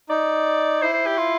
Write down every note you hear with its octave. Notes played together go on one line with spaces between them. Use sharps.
D#4 D5
E4 C5
C5
G4
F4